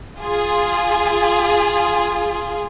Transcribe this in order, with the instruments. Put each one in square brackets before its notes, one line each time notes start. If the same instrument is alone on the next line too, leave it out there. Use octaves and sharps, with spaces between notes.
[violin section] F4 G#4